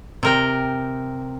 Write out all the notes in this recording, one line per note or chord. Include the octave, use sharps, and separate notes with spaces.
C3 A#4 G5